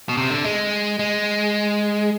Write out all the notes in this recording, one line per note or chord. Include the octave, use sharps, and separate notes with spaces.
B2
C3
D3
G#3
G#3